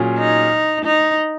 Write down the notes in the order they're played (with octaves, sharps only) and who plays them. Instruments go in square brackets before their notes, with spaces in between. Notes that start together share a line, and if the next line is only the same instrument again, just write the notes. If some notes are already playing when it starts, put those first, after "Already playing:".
Already playing: [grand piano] A#2 F#3 C#4 G#4
[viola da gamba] D#4
D#4